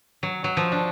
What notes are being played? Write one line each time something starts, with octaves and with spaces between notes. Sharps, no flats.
F#3
F#3
F3
D4